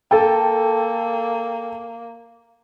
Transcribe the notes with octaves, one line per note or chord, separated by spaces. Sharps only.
A#3 A4 G5